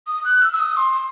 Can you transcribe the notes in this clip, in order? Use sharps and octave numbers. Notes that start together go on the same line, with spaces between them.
D#6
F#6
E6
E6
D#6
C6